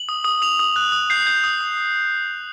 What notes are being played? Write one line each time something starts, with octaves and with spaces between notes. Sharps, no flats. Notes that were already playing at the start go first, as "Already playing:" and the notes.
Already playing: F#7
D#6
D#6
D#6 F7
D#6
F#6
D#6
G6 C7
G6
D#6
D#6